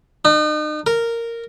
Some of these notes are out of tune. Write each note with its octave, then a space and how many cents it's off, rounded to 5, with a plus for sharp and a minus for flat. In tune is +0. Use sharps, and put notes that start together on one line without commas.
D#4 -40
A#4 -10